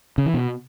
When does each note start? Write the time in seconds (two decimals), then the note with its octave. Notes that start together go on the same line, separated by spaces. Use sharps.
0.18 C#3
0.26 E3
0.34 B2